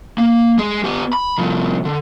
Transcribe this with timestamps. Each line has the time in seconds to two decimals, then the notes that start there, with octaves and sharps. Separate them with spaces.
0.18 A#3
0.58 G#3 G#4
0.84 B3 G4
1.13 B5
1.38 C2 F3
1.85 D3